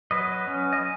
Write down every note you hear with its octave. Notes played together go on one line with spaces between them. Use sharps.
F#3 B4 D#5
C#4
D#5